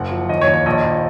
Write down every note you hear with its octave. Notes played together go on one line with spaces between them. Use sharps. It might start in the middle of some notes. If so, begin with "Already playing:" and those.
Already playing: F#1 F#5
F3
D#2 D#5
C#5
D#2
C#5
A#1 D#5
A#1